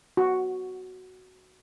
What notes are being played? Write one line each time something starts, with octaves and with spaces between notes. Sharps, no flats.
F#4